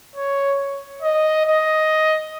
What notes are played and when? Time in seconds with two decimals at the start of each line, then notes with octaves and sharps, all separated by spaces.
0.16 C#5
1.02 D#5
1.46 D#5